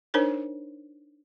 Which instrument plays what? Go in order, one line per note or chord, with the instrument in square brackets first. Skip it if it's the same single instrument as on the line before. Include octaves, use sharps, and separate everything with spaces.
[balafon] D4 D#4 A#4 C5 C#5